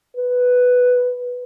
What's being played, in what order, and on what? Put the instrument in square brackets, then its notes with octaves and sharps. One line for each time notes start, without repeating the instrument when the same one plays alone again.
[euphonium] B4